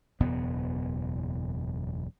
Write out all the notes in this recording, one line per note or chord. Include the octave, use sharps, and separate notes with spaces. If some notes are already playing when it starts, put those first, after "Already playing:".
F#1 E2 B2 B3